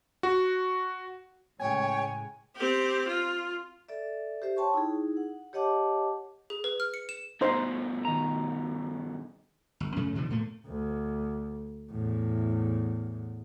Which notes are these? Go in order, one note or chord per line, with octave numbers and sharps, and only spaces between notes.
F#4
A2 C#3 G#3 C#5 G5 G#5
C4 G4
F4
A4 D5 E5
G4 C5 E5
C#5 G5 A5 C6 C#6
D#4 E4 G#4
F#5
G4 C#5 D#5 F#5 A5 D6
G#4
B4
F6
C#7
E7
G2 B2 D#4 C5
D#3 A#5
G1
F#2 C#3 F#3 A3
B2 D3 E3 F3
A2 A3 A#3
D2
E2 A2